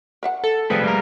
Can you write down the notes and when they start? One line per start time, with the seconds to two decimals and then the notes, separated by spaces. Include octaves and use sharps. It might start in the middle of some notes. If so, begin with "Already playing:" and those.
0.23 A#4 E5 F#5
0.44 A4
0.70 C3 F3 G3 A3 G#4 B4
0.84 G3 A#3 A#4